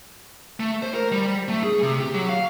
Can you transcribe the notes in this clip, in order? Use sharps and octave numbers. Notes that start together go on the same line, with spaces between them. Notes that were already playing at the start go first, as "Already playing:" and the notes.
A3
C5
A#4
G3
A3
G#4
C3
G4
F#3
F5